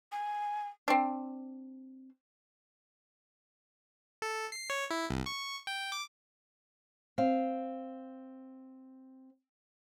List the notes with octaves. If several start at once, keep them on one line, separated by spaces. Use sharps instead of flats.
G#5
C4 D4
A4
C7
C#5
E4
C2
C#6
G5
D6
C4 F5